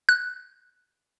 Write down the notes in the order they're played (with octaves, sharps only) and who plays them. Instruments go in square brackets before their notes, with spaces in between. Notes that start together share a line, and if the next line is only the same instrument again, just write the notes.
[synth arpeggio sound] F#6